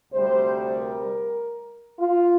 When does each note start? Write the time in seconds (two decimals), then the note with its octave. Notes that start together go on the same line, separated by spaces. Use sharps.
0.13 D2 C3 G3 C5
0.74 A#4
1.99 F4